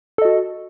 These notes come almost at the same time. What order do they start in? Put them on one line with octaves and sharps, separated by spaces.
A4 D#5 F#4